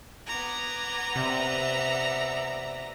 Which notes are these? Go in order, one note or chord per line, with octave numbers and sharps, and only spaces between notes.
B3 A#5 D6 G#6
C3 D5 E5